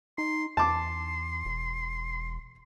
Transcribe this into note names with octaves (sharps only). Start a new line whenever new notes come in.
D#4 C6
E2 A5 C6 D6
E1